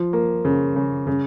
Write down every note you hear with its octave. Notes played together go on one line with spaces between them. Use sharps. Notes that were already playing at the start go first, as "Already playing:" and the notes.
Already playing: F3
A#3
C#3
C#3
C#3